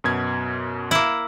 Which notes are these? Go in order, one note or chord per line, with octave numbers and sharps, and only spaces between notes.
F#2 B2 G#6
A#3 E4